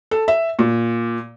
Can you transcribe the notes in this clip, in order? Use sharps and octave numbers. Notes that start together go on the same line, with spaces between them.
A4
E5
A#2